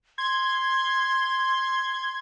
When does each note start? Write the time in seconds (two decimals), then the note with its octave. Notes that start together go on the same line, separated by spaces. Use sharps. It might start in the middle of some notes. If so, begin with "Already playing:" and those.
0.18 C6 G#6